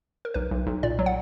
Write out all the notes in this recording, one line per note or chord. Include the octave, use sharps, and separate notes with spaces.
A#4
B1 B4
B1
B1
A#2 D5
F#3
F#5